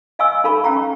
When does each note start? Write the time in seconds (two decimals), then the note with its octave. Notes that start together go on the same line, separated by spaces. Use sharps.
0.19 D#5 F5 G#5 C#6 E6
0.44 D#4 A4 F5 B5 C#6
0.64 C#4 F5 G5 A#5 C#6
0.77 C#6